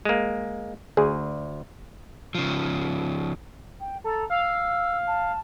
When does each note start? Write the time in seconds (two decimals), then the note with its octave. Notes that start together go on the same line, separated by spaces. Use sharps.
0.05 G#3 A#3
0.97 D2 G#4
2.35 C#3 F3
3.80 G5
4.04 A4 A#5
4.30 F5 E6
5.07 A5